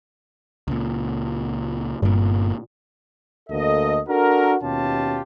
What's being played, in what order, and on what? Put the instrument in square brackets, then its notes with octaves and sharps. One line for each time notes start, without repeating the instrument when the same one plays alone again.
[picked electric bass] C#2 A#2
[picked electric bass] G1 A#2 [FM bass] G2
[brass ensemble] D2 A#3 A4 D#5
D4 F#4 A4 A#4
D#2 B2 C#4 F4 G4 A5